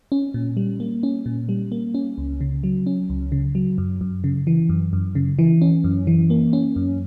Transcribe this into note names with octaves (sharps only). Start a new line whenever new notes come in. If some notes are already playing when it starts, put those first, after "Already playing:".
C#4
A#2
G3
A#3
C#4
A#2
G3
A#3
C#4
C#2
C#3
F#3
C#4
C#2
C#3
F#3
F#2
F#2
C#3
E3
F#2
F#2
C#3
E3
C#4
F#2
E3
A#3
C#4
F#2